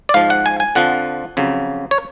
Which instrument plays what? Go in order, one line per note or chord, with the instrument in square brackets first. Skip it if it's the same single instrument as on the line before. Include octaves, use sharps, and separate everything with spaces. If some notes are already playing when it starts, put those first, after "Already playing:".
[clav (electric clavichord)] D5
G#2 F3 F5
F#5
G#5
G#5
F2 D3 F3 F#5
F2 C#3 F#3
C#5